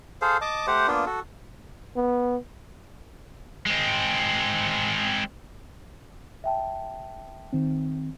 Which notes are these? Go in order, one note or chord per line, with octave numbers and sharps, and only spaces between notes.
G#4 A4 C5 F5
D#5 A5 D6
A3 G4 C5 F#5
A#3 B3 D4 F4
F#4 A4
B3
G#3 C4
E5 G5 A5
D#3 C4